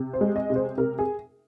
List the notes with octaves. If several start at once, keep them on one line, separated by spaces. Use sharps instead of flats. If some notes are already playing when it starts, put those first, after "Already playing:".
Already playing: C3
C5
G#3
D#5
C3
C5
C3 A#4
G#4